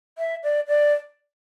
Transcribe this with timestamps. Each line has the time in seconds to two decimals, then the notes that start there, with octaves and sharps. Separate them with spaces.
0.18 E5
0.43 D5
0.67 D5